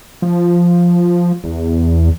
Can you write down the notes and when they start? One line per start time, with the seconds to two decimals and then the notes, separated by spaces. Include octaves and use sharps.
0.22 F3
1.44 E2